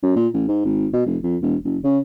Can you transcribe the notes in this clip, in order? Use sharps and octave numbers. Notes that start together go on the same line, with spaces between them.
F#2
A#2
A1
G#2
G#1
B2
F1
F2
E1
F#1
C#3